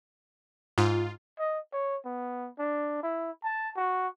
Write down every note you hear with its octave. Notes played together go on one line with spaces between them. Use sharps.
G#2 F4
D#5
C#5
B3
D4
E4
A5
F#4